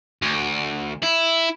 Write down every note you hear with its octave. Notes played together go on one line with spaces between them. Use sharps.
D2
E4